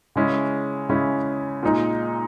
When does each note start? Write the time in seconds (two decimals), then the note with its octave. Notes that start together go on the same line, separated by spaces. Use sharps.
0.16 C#3 G#3 C#4 E4
0.89 C#3 G#3 C#4 E4
1.63 A#2 G#3 D#4